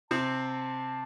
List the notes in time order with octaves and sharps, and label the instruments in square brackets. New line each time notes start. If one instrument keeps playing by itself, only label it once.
[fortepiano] C3 C4 [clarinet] A5